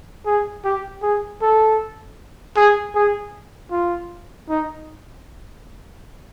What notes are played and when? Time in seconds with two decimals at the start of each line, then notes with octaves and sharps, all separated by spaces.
0.26 G#4
0.65 G4
1.03 G#4
1.42 A4
2.57 G#4
2.95 G#4
3.72 F4
4.50 D#4